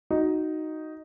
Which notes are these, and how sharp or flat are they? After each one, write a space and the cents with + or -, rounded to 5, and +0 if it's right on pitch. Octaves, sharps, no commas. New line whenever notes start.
D#4 +0 F#4 +0